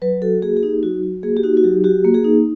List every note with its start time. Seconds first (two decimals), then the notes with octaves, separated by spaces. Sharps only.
0.02 F#3 B4
0.22 F#4 A4
0.42 A#3 G#4
0.57 G#4
0.63 D#4 G4
0.83 F#3 F#4
1.03 F#4
1.23 A#3 G#4
1.37 G4
1.43 D#4 F#4
1.57 F#4
1.64 F#3 G4
1.84 F#4 G4
2.05 A#3
2.14 G#4
2.24 D#4